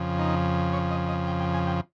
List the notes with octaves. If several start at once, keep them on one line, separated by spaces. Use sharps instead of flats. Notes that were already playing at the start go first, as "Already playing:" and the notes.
Already playing: F2 C#3 F3
D#4
C#5
D#5
D#5
G5
G5
G#5
G5